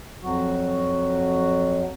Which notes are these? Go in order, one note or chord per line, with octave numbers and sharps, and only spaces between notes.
F2 F#3 F#4